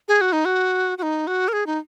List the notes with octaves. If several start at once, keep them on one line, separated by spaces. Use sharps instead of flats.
G#4
F#4
D#4
F#4
F#4
D#4
F#4
A#4
G#4
D#4